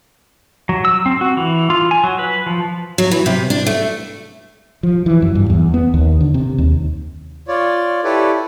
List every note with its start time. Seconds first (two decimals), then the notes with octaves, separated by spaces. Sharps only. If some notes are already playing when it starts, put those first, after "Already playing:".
0.69 F#3
0.85 E6
1.06 C4
1.21 F#4
1.37 E3
1.70 F4
1.91 G#5
2.04 F#3
2.19 B4
2.46 F3
2.98 F#3
3.11 E3
3.26 C3
3.50 D4
3.67 A3
4.83 F3
5.06 E3
5.22 F#2
5.35 G2
5.50 E2
5.74 B3
5.94 D#2
6.21 D3
6.34 C3
6.58 D#2
7.48 F4 C#5 D5
8.04 E4 G4 A4 B4 C#5 D5